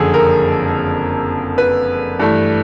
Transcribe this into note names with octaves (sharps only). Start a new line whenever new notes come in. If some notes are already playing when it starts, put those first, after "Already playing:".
Already playing: F#1 F2 D3 G#4 A4
A#4
B4
G2 E3 A3